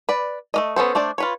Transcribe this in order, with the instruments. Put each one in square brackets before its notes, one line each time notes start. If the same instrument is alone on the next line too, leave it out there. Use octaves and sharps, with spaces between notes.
[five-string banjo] B4 D5
A3 A#3 D#5
B3 C#4 A4 C5
A3 D4 C5 D5
F4 B4 C#5